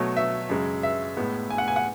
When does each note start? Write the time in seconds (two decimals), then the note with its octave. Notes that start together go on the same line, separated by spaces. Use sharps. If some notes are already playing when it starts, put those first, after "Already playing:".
Already playing: B2 F#3 A3 C#5
0.17 E5
0.49 F#2 C#3 G#3
0.83 E5
1.17 A2 G#3 B3
1.50 G#5
1.58 F#5
1.68 G#5
1.76 F#5